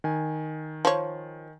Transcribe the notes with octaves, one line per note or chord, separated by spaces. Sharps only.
D#3 G#5
F3 C#5